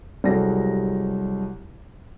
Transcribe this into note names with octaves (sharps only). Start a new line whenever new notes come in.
C2 F#3 G#3 G4 A4 A#6